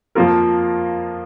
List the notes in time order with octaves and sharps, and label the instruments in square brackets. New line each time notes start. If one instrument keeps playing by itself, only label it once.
[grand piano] F2 F3 A#3 F4 A#4